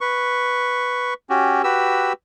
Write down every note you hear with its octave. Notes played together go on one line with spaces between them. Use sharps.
B4 C#6
C#4 F#4 G4
F#4 G4 B4 E6